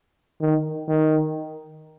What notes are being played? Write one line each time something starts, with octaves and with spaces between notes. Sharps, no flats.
D#3
D#3